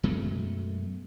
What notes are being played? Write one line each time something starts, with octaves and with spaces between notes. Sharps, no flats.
F#2 B2 G#3 A3